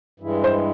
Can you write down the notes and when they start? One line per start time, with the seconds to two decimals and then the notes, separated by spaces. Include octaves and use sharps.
0.20 G2 E3 G#3
0.44 C5